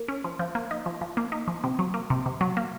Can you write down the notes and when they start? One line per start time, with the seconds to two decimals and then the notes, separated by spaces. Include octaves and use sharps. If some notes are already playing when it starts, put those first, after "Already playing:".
Already playing: A#3
0.08 C#4
0.24 F3
0.39 F3
0.55 A#3
0.71 D#4
0.86 F3
1.01 F3
1.17 A#3
1.32 D#4
1.48 F3
1.64 C3
1.79 F#3
1.94 A#3
2.10 C3
2.26 C3
2.41 F#3
2.57 A#3